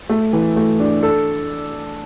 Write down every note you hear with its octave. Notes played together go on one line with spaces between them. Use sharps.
A3
E3
A3
D4
A4